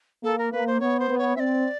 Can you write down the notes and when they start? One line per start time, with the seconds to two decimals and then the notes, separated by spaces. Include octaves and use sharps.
0.23 A#3 A4
0.38 A#4
0.52 A#3 B4
0.67 C5
0.80 B3 C#5
1.00 C5
1.09 B3
1.18 C#5
1.36 C4 E5
1.40 D5